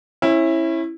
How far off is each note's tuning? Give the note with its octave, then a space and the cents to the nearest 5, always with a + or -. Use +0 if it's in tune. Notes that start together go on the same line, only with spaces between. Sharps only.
C#4 -30 E4 +0